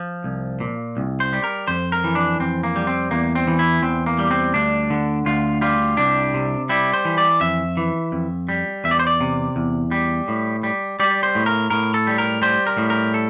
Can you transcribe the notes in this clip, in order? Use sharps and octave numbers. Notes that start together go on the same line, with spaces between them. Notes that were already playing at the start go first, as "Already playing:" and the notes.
Already playing: F3
C2
A#2
C2
C5
G3
A#4
F2 C5
A#4
E3
D4
F2 C4
A#3
G3
C4
E2 A#3
C4
E3
E4
E2 C4
A#3
G3
C4
D2 D4
D3
D2 F4
G3 F4
C2 D4
C3
G3 E4
C5
E3
D5
F2 E5
E3
F2
G3
E2 E5
D5
C5
D5
C3
E2
G3
A2
G3
G3 D5
C5
A2
A#4
A2 A#4
A4
G3
A#4
G3 C5
A#4
A2
A#4
A4